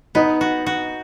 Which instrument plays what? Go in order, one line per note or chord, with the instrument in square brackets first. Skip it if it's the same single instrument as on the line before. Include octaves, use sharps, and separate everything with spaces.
[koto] B3 [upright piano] D#4
[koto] F#4
F#4